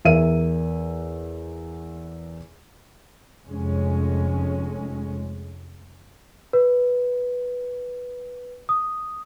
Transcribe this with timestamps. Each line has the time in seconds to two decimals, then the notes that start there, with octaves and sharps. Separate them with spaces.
0.05 E2 A#4 E5 D#7
3.48 F1 F2 G#3 C#4
6.53 B4
8.69 D#6